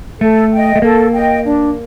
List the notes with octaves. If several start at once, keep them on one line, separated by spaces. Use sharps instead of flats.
A3 A4
D#5 G5
A3
A#3 A4
D#5 G5
D4